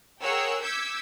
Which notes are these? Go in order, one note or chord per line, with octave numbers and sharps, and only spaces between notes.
G#4 A#4 C#5 F#5 G5 E6
D6 E6 G6 G#6 B6 C#7